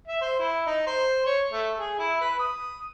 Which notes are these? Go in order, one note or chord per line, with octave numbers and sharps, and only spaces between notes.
E5
C5
E4
D#4
C5
C#5
A3
G#4
E4
B4
D#6